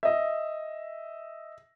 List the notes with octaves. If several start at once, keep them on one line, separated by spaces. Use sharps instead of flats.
D#5 E5